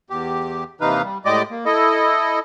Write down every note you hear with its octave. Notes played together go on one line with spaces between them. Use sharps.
E2 G4
D#2 C3 E3 D#4 B4 F5
G3
A2 G#3 G4 D5 D#5 D6
A#3
E4 A4 D#5